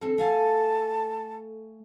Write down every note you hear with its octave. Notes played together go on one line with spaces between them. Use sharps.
D3 C4 A4
A3 F5 G#5 A5